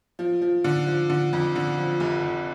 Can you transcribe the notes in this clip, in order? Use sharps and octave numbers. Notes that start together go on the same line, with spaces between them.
F3
F3
D3
F3
D3
F2
D3
F3
F1
F1